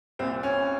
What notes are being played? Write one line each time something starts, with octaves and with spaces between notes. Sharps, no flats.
C2 A#2 C4
C#4